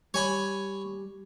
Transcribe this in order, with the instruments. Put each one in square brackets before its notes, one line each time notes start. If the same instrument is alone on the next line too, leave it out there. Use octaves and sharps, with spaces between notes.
[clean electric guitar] G3 [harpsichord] C#5 G#5 B5